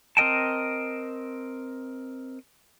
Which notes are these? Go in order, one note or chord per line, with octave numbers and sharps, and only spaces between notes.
C4 A#4 D#5 G5 A5